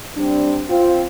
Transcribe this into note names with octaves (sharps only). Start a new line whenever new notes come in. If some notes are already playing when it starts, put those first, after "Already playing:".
G3 C4 D4
C4 F4